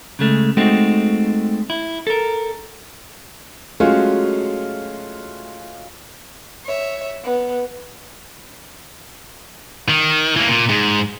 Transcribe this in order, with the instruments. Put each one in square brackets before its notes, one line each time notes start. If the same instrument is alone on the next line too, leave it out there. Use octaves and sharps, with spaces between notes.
[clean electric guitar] C#3 G#3 A3
G#3 A3 C4 D#4 F#4
E4
A4 A#4
[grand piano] F#3 G#3 A3 C#4 F4 F#4
[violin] C#5 E5
B3
[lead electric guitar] D#3
E3 A#3
A#2
G#2